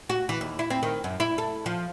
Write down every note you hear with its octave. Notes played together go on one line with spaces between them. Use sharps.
F#4
E3
D#2
E4
C4
D#3
F#2
E4
A4
F3